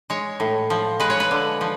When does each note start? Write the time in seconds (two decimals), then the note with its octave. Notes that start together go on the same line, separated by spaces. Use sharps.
0.10 G#3 C#5
0.40 A2
0.70 F3
1.00 G#3 B4
1.10 C#5
1.20 B4
1.31 D3
1.61 F3